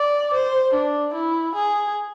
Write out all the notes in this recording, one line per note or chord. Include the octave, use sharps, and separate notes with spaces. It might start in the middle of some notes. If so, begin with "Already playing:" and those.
Already playing: D5
C5
D4
E4
G#4